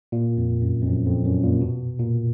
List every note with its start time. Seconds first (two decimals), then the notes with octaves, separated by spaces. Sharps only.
0.12 A#2
0.37 F2
0.62 F#2
0.82 F2
0.87 F#2
1.06 F2
1.25 F#2
1.44 A#2
1.61 B2
1.99 A#2